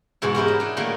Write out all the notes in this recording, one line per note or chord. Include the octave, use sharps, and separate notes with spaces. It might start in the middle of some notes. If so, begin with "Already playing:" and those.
E2 G#2 B2 E4
D#4 E4 G4 A#4
F#3
D4 D#4
A2 D#3 A3 A#3